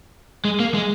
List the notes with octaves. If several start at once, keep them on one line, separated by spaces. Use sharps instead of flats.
G#3
A#3
G#3